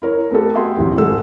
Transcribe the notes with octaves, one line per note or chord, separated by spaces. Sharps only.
E4 A#4 C#5
A3 B3 G4 A4
F#4 G#4 E5 G5 C6
A#1 D#2 C3 E3 F#3
G#1 G#2 G#3 A4 F#5 E6